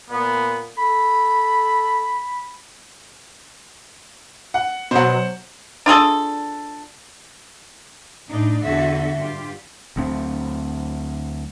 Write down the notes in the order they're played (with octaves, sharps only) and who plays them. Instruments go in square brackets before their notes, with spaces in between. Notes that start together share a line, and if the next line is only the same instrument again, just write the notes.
[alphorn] A#2 [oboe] B3
[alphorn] A4 [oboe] B5
[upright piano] F#5
[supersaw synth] B2 F#3 [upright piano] C5 F#5
[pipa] D4 F4 G#4 A4
[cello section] A2 D4 D#4
E2 D3 F#4 A4 E5
G2 F4 G4
[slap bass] D2 F#3 A3 C4